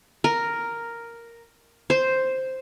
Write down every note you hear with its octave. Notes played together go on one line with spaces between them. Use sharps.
A#4
C5